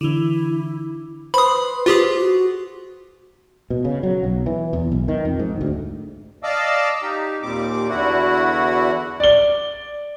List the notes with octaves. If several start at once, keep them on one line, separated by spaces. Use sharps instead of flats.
D3 E3 E4
B4 C5 B5 C6 D#6
F4 G4 G#4
F#4
B2
C#3
F#3
B1
E3
E2
B1
D#3
F2
G#2
D2
D5 D#5 F5 A5 D6 E6
D#4 G4
D#2 A#2 G3 C4 D6
E2 D3 E4 F#4 F#5
D5 G7